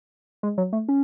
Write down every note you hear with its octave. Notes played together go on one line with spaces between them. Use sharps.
G#3
F#3
A3
C#4